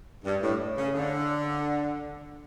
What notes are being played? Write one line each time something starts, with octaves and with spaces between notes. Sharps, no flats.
G2
A2
C#3
D3